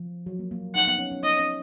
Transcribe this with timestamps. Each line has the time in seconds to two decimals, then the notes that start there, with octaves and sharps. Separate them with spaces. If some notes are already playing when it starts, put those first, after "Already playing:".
Already playing: F3
0.26 F#3
0.39 A#3
0.51 A#3
0.75 D#4 F#5
0.87 B3
0.99 C#4
1.12 C#4
1.23 D#4 D#5
1.39 C#4